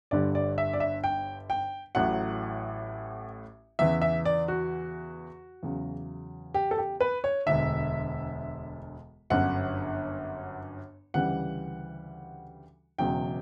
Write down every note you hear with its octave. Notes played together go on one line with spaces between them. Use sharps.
G1 G2 D3 G3 D5
D5
E5
D5
E5
G5
G5
A1 A2 F#3 F#5
E2 C#3 E3 E5
E5
D5
F#4
E2 C#3 F#3
G4
A4
G4
B4
C#5
E1 D2 D3 E5
G1 F#2 D3 F#5
D2 C#3 E3 G3 F#5
E1 E2 C#3 F#3 G5